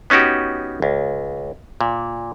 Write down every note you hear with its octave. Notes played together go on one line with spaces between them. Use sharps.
B3 C#4 D#4 F#4 G4
C#2
A#2